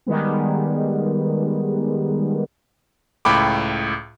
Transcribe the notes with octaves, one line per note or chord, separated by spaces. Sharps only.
D#3 G3 G#3 B3
C#2 A2 G5 B5 D6